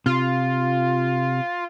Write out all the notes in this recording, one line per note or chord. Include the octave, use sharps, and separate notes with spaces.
C3 F4